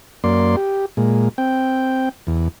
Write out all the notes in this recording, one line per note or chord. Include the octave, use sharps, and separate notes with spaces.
F#2 A#3 D5 C6
G4
A#2 G#3
C4 G5
E2